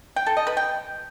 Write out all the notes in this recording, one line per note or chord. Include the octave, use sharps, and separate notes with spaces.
G5
A4
D#5
B4
G5